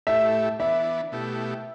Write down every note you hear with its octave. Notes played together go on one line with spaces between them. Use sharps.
A2 A3 E4 G4 E5
E3 B3 D4 E5
B2 A3 E4 G4